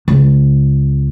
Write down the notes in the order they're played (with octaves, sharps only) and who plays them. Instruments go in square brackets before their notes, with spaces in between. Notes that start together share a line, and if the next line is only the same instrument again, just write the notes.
[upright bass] C#2